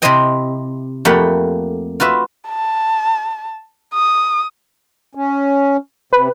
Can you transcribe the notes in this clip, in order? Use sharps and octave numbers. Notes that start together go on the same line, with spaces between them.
C3 E4 G4 C5 D#5 G5
F2 A3 A#3 G4 F#5 B5
F4 F#4 B4 E5
A5
D#6
C#4
C3 B4